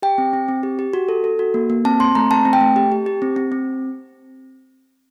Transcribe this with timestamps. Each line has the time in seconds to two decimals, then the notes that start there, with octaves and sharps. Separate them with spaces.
0.02 G4 G5
0.18 C4
0.33 C4
0.48 C4
0.63 G4
0.79 G4
0.93 F#4
1.09 A4
1.24 A4
1.39 F#4
1.54 A#3
1.70 A#3
1.85 C4 A5
2.00 C4 C6
2.15 A3 A#5
2.31 C4 A5
2.45 C4
2.53 G5
2.61 A3
2.76 G4
2.92 G4
3.06 G4
3.22 C4
3.36 C4
3.52 C4